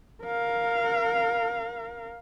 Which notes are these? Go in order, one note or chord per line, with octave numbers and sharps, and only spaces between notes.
A#4 F5